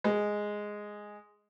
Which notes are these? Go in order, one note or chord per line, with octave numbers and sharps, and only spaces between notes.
G#3